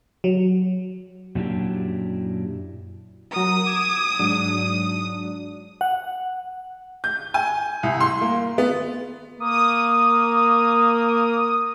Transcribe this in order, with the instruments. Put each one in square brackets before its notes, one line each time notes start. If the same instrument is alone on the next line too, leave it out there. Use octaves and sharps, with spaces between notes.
[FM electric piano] F#3
[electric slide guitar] F#2 A#2 F#3 D4 E4 G4
[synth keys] F#3 A#4 [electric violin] D#6
[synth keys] D6 G#6 E7
G#2 F#3 D4
[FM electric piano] F#5
[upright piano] G6
G#5
C2
C6
A#3
B3
[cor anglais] A#3 [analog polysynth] D#6